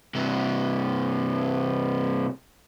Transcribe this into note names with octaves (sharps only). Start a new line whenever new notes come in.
G2 C3